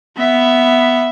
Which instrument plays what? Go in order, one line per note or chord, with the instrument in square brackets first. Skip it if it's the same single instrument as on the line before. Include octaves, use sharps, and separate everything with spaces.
[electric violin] B3 E5